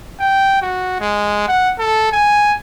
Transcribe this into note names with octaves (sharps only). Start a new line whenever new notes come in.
G5
F#4
G#3
F#5
A4
G#5